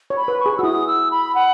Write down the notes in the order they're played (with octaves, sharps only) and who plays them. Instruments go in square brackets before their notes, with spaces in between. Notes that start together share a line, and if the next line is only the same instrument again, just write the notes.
[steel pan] C#5
[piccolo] B5
[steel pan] B4
[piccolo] C#6
[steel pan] G#4
[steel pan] F#4 [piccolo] E6
[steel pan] E4 [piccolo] D#6
[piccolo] E6
B5
F#5